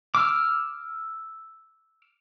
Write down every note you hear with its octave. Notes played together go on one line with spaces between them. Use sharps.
D6 E6 F6